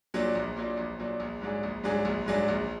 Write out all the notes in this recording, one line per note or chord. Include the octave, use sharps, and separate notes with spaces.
A#2 F#3 D4
A#1
A#2 F#3 D4
A#1
A#2 F#3 D4
A#1
G#2 F#3 D4 G#4
A#1
G#2 F#3 D4 G#4
A#1
G#2 F#3 D4 G#4
A#1